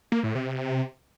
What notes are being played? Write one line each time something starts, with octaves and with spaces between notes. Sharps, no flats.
A#3
A2
C3